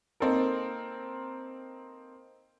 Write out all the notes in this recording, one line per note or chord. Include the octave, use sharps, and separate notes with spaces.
A#3 C4 D#4 A4 A#4